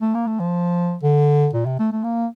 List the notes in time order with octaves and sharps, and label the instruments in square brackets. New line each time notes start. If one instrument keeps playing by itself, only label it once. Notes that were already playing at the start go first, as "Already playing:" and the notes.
[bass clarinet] A3
A#3
A3
F3
D3
A#2
C3
A3
A3
A#3